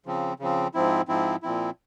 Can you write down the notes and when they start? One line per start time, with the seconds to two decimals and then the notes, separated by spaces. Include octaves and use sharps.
0.06 C#3 F3 C4
0.40 C#3 F3 C4
0.74 G#2 F3 C4 E4
1.08 G#2 F3 C4 E4
1.43 A#2 F3 C4 E4